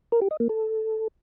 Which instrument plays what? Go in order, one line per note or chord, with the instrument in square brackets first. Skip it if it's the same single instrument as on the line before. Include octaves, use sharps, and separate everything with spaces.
[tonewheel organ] A#4
G4
D#5
A#3
A4